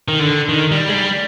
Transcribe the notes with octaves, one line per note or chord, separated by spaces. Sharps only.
D#3
D3
D#3
G3
G#3
G3